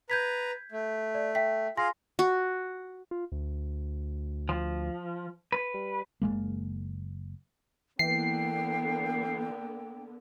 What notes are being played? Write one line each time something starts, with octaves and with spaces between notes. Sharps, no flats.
B4 A#5 G6 G#6 B6
A3
D5
E5 G5 B6
F4 G#4 F5 G#5 C6 A#6
F#4
F4
D2
F3
B4
G3
F#1 E2 G#3 A#3
D3 E3 A#3 B3 G5 C7